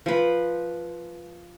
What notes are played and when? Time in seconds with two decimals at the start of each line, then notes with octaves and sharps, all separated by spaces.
0.06 F3 B4